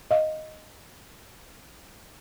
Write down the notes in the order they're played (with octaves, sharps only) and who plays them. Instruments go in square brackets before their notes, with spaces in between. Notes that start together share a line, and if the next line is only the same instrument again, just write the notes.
[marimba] D#5 F5